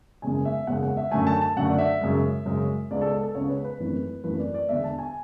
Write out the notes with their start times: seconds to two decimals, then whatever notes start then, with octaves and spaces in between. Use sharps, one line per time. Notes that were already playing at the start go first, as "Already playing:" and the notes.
0.22 F#1 E2 C#3 G#3 G#5
0.45 E5
0.67 F#1 E2 C#3 G#3 F#5
0.83 F#5
0.97 E5
1.11 F#2 D3 A3 G#5
1.27 A5
1.42 A5
1.56 F#2 D3 A3 F#5
1.70 D5
1.78 E5
2.01 F#2 C#3 G#3
2.45 F#2 C#3 G#3
2.91 C#2 C#3 G#3 B3 D5
3.01 A4
3.12 A4
3.23 A4
3.35 C#2 C#3 G#3 B3 C#5
3.50 B4
3.65 B4
3.80 G#1 F#2 E3 A3
4.24 G#1 F#2 E3 A3 B4
4.39 D5
4.54 D5
4.69 E1 E2 D3 E5
4.84 A5
4.99 G#5